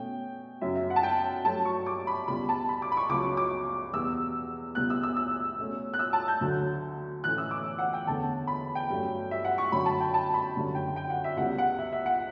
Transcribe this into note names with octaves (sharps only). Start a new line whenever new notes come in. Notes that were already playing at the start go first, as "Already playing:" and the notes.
Already playing: B2 A3 C#4 G5
F#2 C#3 F#3 E5
E5
F#5
A5
G5
G2 F#3 A3 C#4 A5
C#6
D6
B5
C#2 B2 G3 B5
A5
B5
D6
B5
C#6
C#2 C#3 F#3 C#4 D6
C#6
D6
E2 B2 G3 B3 E6
C#2 B2 G3 B3 F#6
E6
E6
E6
B2 A3 C#4
F#6
E6
A5
G6
D2 D3 F#3
A2 E3 A3 C#4 F#6
E6
D6
F#5
G5
E2 D3 A3 C#4 A5
B5
G5
G2 F#3 A3 C#4
E5
F#5
C#6
F#2 D3 F#3 C#4 B5
A5
G5
A5
B5
F#2 D3 G3 C#4
G5
G5
F#5
E5
C#2 C#3 G3 B3 F#5
F#5
E5
E5
F#5